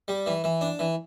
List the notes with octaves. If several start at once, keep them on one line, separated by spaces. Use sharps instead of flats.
G3
E3
E3
D4
E3